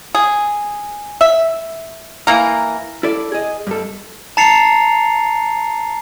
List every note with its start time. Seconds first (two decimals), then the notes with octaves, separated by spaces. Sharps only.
0.15 G#4
1.21 E5
2.27 E3 A#3 A#4
3.03 E4 A4 D5
3.32 G#4 D#5
3.67 G2 A4
4.37 A5 A#5 A6 C7 C#7 F7